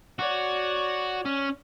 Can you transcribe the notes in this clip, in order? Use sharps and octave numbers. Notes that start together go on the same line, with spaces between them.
F#4 C#5 D5
C#4